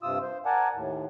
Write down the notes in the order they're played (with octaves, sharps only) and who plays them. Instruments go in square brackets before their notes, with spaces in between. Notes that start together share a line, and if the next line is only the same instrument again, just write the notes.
[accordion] G2 C3 F4 D#6 E6
C5
A#4 D5 F#5 G#5 A5
D#2 A2